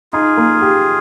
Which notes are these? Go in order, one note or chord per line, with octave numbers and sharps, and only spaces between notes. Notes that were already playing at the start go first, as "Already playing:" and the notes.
D#4 F4 G#4
A#3
G4